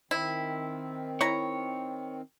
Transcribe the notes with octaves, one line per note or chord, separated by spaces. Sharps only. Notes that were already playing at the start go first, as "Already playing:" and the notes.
D#3 C4 E4
E4 C#5 A#5